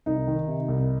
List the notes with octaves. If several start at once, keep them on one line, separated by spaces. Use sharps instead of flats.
C2 D#4
D#3
C3
C2